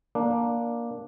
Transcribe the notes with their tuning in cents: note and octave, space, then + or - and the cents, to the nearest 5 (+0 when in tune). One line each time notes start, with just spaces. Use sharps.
A#3 +10 D4 +0